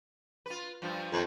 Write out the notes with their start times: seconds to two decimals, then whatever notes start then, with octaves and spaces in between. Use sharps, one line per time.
0.46 F4 B4
0.82 G2 F3 F4
1.13 F2 D#3 A3